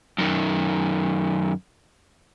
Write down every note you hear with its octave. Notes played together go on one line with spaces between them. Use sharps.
F#2 D#3